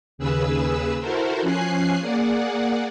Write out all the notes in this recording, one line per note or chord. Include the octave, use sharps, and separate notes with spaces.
D#2 C#3 G#4 B4 E6
E4 F#4 A4 A#4 C5
F3 C#4 G#5 F#6 C7
A#3 G#4 D5 F#5